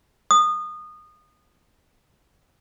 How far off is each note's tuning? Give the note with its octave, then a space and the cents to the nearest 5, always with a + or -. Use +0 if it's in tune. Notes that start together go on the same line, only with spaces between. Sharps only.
D#6 -25